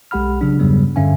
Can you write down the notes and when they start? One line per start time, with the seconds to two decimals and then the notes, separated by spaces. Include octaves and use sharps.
0.11 B1 G#3 G4 F#5 B5 F6
0.41 C#3 F#3 D4
0.60 E2 G2 C#3 F#3 G3 B3
0.96 G2 D3 C#4 E5 F5 G#5